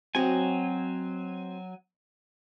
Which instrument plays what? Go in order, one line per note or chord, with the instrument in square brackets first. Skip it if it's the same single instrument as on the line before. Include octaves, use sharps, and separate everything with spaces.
[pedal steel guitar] F#3 G#5 [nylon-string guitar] C4 F#4 D#5